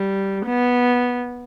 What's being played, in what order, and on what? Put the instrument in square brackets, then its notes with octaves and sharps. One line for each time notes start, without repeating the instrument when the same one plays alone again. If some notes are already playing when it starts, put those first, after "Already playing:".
Already playing: [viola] G3
B3